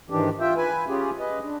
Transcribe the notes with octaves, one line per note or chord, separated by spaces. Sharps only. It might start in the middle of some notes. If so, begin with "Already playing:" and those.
G#2 D#3 E3 D4 G4
F4 E5 G5
B4 G#5
C#4 F4 G4 G#4
B4 D#5
D4